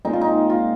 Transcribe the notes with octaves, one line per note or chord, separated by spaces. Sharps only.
A#2 G#3 C4 D#4
F4
D#4
F4